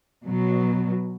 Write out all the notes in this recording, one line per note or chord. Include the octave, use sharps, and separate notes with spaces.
B2 F#3